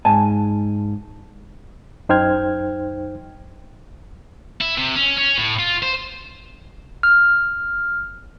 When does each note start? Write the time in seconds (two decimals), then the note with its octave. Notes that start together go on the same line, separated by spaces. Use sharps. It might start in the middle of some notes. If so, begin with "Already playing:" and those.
0.05 G#2 G#5 A5
2.09 F#2 D#4 C5 G5 F6 G#6
4.61 E4
4.78 C3
4.96 C#4
5.18 C#4
5.38 A2
5.59 F4
5.83 C5
7.03 F6